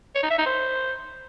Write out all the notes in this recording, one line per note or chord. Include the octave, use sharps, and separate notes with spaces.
C#5
D#4
E5
D#4
C5